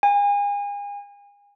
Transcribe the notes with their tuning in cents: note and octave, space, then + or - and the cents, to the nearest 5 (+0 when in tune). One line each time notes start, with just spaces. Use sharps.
G#5 -40